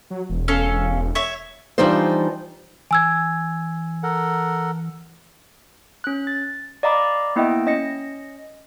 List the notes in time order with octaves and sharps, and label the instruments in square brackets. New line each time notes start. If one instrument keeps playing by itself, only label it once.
[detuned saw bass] F#3
E1
[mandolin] C#4 A4 F5
C#5 E5
[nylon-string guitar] E3 F3 G3 D4 D#4 C5
[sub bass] E3 [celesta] G#5 E6 G#6
[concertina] A4 A#4 F#5
[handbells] C#4 F#6
A6
D5 D#5 F5 A#5 B5 D6
A#3 B3 E4 D#5 E5 G5
C#4 D#5 A#6 C#7